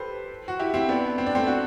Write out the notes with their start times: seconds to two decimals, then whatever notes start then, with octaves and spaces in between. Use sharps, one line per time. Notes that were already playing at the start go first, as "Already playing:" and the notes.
Already playing: G4 A4 B4 C5
0.48 F#4
0.59 E4 G4
0.74 C4 E4
0.89 B3 D4
1.18 C4
1.26 D4
1.35 A3 C4
1.47 D4 F#4